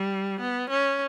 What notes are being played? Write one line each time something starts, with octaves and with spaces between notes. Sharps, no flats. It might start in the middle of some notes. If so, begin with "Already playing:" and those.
Already playing: G3
B3
C#4